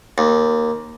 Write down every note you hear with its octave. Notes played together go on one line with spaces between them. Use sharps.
D#2